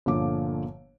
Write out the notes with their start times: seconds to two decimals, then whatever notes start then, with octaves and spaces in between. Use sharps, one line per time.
0.06 G1 A#2 D3 F3 D6